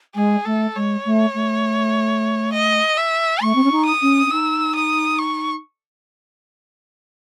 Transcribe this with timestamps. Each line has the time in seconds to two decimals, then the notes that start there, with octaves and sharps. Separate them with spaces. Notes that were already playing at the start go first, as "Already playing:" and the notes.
0.15 G#3 G#4
0.45 A3 A4
0.75 G#3 C#5
1.05 A3
1.34 A3
2.53 D#5
2.97 E5
3.41 A3 C#6
3.55 C4
3.63 C#4
3.71 D#4
3.86 D#6
4.01 C#4
4.26 C#4
4.31 D#4 E6
4.75 D#6
5.19 C#6